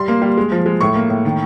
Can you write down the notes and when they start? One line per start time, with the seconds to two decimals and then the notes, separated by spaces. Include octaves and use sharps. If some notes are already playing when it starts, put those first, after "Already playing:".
Already playing: G3 C6
0.08 A#3
0.22 G3
0.37 G#3
0.52 F3
0.66 G#3
0.81 A2 C#6
0.95 A#3
1.10 A2
1.25 D#3